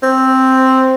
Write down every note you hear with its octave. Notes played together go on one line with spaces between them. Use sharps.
C4